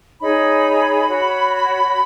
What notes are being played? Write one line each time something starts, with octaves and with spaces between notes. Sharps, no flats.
D#4 G#4 C#5 B5
F#4 C#5